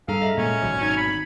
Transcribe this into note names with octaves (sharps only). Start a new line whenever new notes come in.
G2 G#4 A4 F5 A#5
D#5 E5 A#5
A#2 G#3 C#4
G#1 B2 F#3
D#4 G#6 C#7
B5